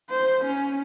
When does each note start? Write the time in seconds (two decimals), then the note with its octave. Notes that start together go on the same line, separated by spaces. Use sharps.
0.11 C5
0.45 C#4